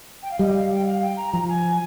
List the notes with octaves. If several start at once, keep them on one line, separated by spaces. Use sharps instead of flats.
G5
F5
G3 D#5
F5
G5
F5
G5
A#5
F3 A#5
G#5